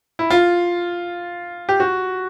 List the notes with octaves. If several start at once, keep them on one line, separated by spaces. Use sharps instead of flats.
E4
F4
G4
F#4